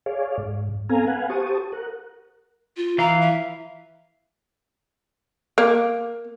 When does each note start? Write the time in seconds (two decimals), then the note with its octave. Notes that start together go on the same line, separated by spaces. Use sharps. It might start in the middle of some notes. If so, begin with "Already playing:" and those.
0.06 G#4 C#5 D5 F5
0.38 G#2
0.89 B3 C4 A4 F5 G#5 A#5
1.07 B4 F5 F#5 G#5
1.30 G4 C5 A5 C#6 D#6
1.72 A#4 F#5
2.77 F4
2.98 E3 F5 A#5
3.21 E5
5.58 A#3